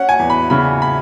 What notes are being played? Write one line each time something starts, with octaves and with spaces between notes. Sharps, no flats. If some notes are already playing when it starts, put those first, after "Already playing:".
Already playing: C#4 F#5
G#5
E2
B5
C#3 B5
B5